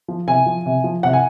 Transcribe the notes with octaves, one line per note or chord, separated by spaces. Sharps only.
F3
C3 G#5
F3
C3
F3
C3 F#5
G#5